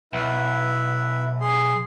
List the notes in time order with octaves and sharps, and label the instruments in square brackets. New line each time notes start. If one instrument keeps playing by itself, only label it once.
[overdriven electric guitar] B1 [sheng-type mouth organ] E4 B4 E5
[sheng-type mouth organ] G#4 C6